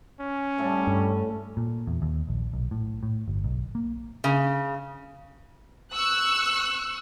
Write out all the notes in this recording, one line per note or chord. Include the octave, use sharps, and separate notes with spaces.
C#4
A2 G3 A3
G2
A#2
E2
D#2
A#1
B1
A2
A2
G1
B1
A#3
C#3
C#6 E6 F#6